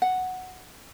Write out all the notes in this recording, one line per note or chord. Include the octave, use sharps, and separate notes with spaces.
F#5